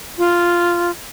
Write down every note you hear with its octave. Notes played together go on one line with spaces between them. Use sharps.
F4